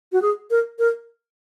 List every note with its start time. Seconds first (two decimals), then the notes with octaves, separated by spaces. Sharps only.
0.12 F#4
0.22 G#4
0.51 A#4
0.79 A#4